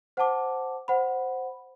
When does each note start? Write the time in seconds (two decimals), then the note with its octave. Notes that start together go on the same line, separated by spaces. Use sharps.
0.17 C5 F#5 A5 D6
0.88 C5 F#5 B5